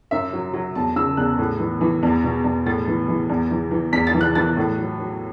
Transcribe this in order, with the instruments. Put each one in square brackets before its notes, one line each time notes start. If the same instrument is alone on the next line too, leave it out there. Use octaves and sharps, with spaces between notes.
[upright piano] F#2 E5
F#3
F#3
E2 A5
C#3 E6
E2 F#6
A2
E3
E3
E2
B2
E2
A2 A6
E3
E3
E2
E3
E3
E2 B6
A6
E3
F#6
E3 A6
A2
F#3
F#3